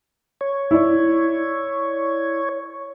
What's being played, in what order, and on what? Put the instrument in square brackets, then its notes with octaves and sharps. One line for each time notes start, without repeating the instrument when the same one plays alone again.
[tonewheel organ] C#5
[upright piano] E4 D5